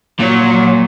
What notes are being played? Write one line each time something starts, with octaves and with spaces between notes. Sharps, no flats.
A#2 F#3